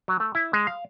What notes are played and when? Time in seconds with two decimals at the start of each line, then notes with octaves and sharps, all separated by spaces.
0.08 F#3
0.20 A3
0.35 E4
0.53 G#3
0.67 F5